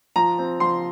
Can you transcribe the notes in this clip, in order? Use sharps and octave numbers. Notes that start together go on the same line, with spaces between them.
F3 A#5
C4
F3 C6